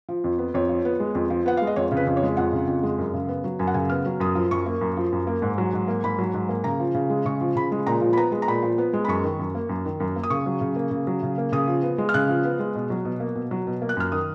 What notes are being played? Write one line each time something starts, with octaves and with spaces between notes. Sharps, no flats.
F3
F2
B3
F2 C#5
F3
B3
G#3
F2
F3
B3 F#5
G#3 F5
D#5
F2 C#5
C#3
B4
F2
C#5
G#3
F2 F#5
C#3
F2
G#3
F#2
C#3
B3
F#3
F#2 G#5
F#5
C#3 G#5
B3 F6
F#3
F#2 D#6
F3
F#2 C#6
A#3
F#2
F3
F#2
A#3
G#2
F#3
G#2
A#3
G#2 B5
F#3
G#2
A#3
C#3 A#5
F3
C#3
G#3
C#3 C#6
F3
C#3 B5
G#3
A#2 A#5
F3
B5
B3 A#5
G#3
A#5
A#2 B5
F3
B3
G#3
B5
F#2 C#6
D#3
F#2
A#3
F#2
D#3
F#2
A#3
D#6
C#3 C#6
F#3
C#3
A#3
C#3
F#3
C#3
A#3
C#3 D#6
F3
B3
G#3
F6
C#3 F#6
F3
B3
G#3
B2
F#3
B2
A#3
B2
F#3
B2
A#3
F#6
F#2 F6
D#3 D#6